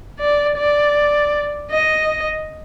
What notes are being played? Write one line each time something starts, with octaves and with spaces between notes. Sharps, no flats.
D5
D5
D#5